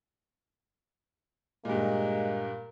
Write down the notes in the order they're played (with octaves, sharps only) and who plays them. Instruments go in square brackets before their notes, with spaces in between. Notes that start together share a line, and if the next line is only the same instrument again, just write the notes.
[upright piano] G2 A#2 [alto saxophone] G#3 [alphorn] A#3